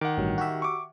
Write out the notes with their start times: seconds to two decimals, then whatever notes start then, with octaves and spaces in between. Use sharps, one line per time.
0.01 D#3 F#5 D6
0.17 A1 G2 F#3
0.38 F#4 G4 E5
0.62 C#6 D6